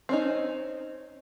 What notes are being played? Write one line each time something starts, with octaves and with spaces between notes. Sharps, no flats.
C4 C#4 D#4